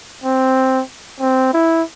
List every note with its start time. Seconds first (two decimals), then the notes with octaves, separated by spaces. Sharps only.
0.24 C4
1.20 C4
1.53 E4